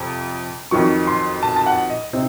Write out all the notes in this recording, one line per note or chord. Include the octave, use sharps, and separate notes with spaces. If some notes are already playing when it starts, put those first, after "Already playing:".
Already playing: F2 C3
F2 D#3 F#3 C#6
C6
A5
A5
F#5
D#5
C3 C4 D#4